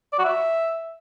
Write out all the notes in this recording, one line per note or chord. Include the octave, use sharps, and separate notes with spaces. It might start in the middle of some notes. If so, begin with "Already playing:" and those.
D5
F#4
E5